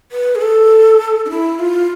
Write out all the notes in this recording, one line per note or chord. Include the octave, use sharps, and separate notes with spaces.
B4
G#4
A4
D4
E4
F4